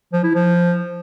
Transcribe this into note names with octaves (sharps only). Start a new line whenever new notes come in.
F3
E4
F3